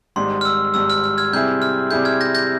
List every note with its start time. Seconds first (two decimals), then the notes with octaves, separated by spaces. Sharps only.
0.16 G#1 G#2 G3 C6
0.41 F6
0.45 E6
0.74 G#1 G#2 G3 E6
0.90 F6
1.04 F6
1.18 F6 G#6
1.33 C3 G3 C4 E4 G#4 G6
1.62 F6
1.91 C3 G3 C4 E4 G#4 G6
2.05 F6 G#6
2.21 G6 A#6
2.35 G6 A#6